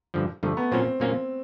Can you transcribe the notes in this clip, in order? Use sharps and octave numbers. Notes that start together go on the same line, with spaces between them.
G2 D3 F3
G2 D3 F3 A3
B3
A#2 F#3 A#3 C4 C#4 F4
A#2 F#3 A#3 C#4 F4